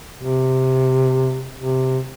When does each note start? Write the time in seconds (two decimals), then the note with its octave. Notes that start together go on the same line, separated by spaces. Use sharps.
0.17 C3
1.57 C3